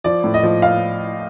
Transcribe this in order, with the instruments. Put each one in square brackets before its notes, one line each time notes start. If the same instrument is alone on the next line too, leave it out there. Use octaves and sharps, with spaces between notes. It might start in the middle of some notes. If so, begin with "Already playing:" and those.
[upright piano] F3 D5
A2
D#5
F3
F5